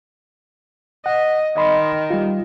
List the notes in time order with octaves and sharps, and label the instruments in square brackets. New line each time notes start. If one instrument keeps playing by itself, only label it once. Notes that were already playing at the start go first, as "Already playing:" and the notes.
[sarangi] D#5 [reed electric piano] F#5
[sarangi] D#3 [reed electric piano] D#5 B5 C6
[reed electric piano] G3 F4